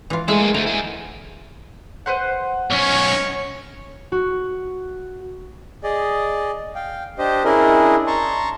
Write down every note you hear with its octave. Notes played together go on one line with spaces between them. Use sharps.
E3 F4
G#3 A3 E4 G#4
A#3 G#4
D3 A3 A#5
E4 G#4
B4 C5 F#5
B1 C#4 C#5
F#4
G#4 D5 D#5
F5 G5
D4 G4 C5 D#5
C#4 D4 E4 G#4 A#4 D#5
A5 A#5 C6 C#6